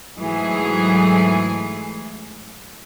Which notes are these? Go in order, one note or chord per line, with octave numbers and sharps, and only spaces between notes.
G#2 E3 F#3 A3 G#4